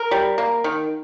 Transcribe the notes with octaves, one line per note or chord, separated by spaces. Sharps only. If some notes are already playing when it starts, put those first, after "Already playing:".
Already playing: A#4
G3
A#3
D#3